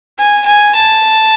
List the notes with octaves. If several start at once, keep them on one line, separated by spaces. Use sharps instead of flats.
G#5
G#5
A5